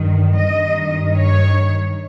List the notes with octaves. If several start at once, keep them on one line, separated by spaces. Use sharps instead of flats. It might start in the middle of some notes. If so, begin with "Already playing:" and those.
Already playing: G2 D#3
G2 D#3 D#5
C#5